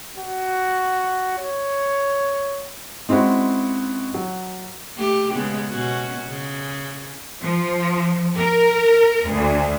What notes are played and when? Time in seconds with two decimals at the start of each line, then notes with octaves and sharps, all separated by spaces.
0.19 F#4
1.38 C#5
3.09 G#3 C4 C#4 E4 F#4
4.14 F#3
4.96 A3 G4
5.34 C#3 G#3 B3
5.70 B2 C#4 F#4
6.29 C#3
7.41 F3
8.38 A#4
9.29 D2